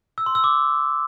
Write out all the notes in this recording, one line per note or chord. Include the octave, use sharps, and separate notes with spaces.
E6
C6
E6
D6